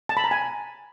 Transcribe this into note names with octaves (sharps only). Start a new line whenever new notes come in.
A5
B5
A#5
G#5